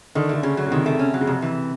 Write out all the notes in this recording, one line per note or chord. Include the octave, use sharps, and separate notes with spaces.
D3 D#3
D3 A3
C#3 C#4
F#3
C#3
C3 D#3
A3
C#4
F#3
C#3
F2 C3
E3